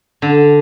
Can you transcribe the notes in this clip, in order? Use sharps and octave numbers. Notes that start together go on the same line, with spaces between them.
D3